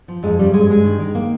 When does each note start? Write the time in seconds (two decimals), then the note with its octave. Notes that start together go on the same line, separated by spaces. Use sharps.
0.08 F3
0.23 F2 G#3
0.39 C#3 G3
0.54 G2 G#3
0.70 G2 G#3
0.85 D#3
0.99 D#3
1.15 A#3